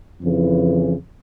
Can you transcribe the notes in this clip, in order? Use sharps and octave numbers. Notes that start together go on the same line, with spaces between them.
F2 C#3 E3